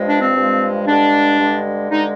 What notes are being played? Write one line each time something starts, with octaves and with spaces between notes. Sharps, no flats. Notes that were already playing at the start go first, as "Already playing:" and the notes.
Already playing: G2 F3 G#3
D4
C4
G2 F3 G#3
G2 D3 G#3 D4
G2 D3 G#3
G2 D3 G#3 D#4